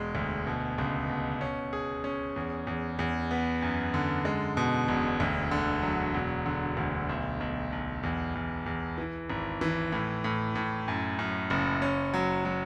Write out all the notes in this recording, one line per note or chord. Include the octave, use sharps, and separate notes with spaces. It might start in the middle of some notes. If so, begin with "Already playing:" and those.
Already playing: E1 G#3
D2
B2
C#2
B2
C#4
G#4
C#4
E2
E2
E2
B3
F#2
D3
G#3
B2
E1
D2
D3
F#3
E1
D3
D2
B1
B1
B1
E2
E2
E2
E3
G#1
E3
A2
A2
A2
F#2
F#2
F#1
C#4
F#3
F#3